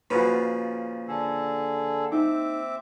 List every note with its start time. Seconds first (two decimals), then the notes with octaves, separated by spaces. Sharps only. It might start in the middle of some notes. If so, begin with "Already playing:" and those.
0.10 A#2 C#3 F3 F#4 B4
1.08 D3 G#4 A4
2.12 C4 D#4 E5 D6